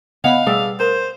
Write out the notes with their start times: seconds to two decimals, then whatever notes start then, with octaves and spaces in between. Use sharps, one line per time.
0.24 C#3 B3 D#5 F5 F#5 B5
0.46 B2 G3 A3 G#4 D5 E5
0.80 A#4 C5